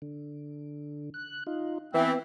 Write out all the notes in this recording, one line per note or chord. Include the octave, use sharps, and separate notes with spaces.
D3
F#6
D#4 F4
E3 B3 C4 E5